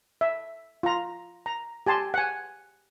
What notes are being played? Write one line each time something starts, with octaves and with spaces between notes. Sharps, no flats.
E5
F4 A#5
A#5
G4 G#5 A5 C6
F#5 G#5